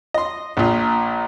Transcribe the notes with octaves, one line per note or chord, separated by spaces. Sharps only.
D#5 C6
A#1 A#2